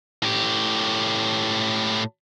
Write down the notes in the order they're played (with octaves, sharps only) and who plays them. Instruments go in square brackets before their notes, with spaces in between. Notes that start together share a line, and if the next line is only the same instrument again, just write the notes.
[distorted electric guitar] A2 G4